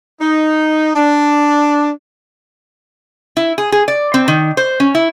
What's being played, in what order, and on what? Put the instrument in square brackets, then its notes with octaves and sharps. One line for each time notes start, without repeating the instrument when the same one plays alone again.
[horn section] D#4
D4
[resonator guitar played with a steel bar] E4
G#4
G#4
D5
C4
D#3
C5
C#4
E4